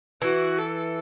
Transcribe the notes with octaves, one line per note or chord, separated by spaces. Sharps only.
E3 F#4
A4